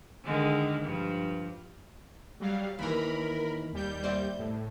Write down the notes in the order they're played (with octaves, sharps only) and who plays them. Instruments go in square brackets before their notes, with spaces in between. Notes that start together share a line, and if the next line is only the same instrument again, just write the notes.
[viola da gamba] D3 D#3 G#3
G2 F3
[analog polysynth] F#3 G3 F5
[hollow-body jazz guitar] D#2 E3 [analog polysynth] A#4 B5
[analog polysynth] D#2 G3 G6
[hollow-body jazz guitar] C5 D5 E5
[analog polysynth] A2